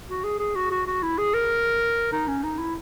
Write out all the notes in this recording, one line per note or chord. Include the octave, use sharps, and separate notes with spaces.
F#4
G#4
G#4
F#4
F#4
F#4
E4
G#4
A#4
D#4
C#4
D#4
E4